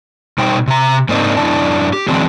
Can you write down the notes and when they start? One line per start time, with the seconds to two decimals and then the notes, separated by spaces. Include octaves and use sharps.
0.38 B2 G3 D#4 C5 G5
0.67 C3 A#5
1.09 G#2 A#3 C4 D4 D#4
1.37 F#2 E3 D4 E4 D5 A5
1.93 G4
2.08 D3 E3 F#3 G#3 C4 D4